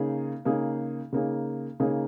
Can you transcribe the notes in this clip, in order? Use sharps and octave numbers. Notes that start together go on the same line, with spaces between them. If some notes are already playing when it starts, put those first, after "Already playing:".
Already playing: C#3 A#3 D#4 G#4
C#3 A#3 D#4 G#4
C#3 A#3 D#4 G#4
C#3 A#3 D#4 G#4